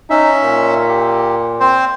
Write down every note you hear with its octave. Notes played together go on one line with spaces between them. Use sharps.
C#4 D#4 E5
A#2
G4
C4 C5